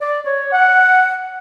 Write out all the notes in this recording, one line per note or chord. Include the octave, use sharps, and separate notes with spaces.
D5
C#5
F#5